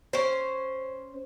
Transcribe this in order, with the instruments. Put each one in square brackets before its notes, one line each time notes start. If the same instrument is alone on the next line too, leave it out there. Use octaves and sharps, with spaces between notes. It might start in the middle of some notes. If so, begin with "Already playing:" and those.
[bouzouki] C#4 C5